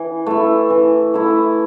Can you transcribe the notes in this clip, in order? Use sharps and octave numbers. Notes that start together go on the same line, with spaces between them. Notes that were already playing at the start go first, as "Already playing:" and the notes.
Already playing: E3
A3 E4
E3
A3 E4